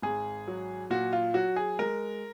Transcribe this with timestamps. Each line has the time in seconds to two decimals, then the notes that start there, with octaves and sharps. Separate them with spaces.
0.02 G#1 G#4
0.48 F#3
0.90 A#2 F#4
1.13 F4
1.34 F#3 F#4
1.56 G#4
1.79 G#3 A#4